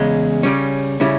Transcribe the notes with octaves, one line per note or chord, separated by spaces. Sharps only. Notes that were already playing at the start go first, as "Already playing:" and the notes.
Already playing: E2 C#3 G#3
C#3 G3 C#4
C#3 G3 C#4 E4